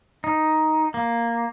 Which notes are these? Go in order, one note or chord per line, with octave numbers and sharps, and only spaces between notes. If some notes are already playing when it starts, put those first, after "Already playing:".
D#4
A#3